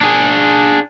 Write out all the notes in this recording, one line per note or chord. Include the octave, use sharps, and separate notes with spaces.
D4 G#4